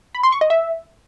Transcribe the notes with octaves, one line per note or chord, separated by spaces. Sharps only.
B5
C6
C#6
D#5
E5